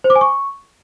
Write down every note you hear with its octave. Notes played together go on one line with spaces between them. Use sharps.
C5
D6
G#5
C#6